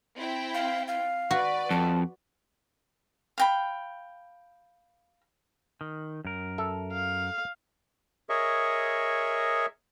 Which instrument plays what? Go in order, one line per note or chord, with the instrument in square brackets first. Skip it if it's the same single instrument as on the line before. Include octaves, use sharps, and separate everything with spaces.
[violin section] C4 E4 G5
[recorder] F5
F5
[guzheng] F#4 [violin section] B4 D5
[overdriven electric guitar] F2 [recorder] A5
[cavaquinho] F5 G5 B5
[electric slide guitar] D#3
F#2 A#4
[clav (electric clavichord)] A4 E5
[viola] F5
[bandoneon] G#4 A#4 C#5 D#5 E5 C#6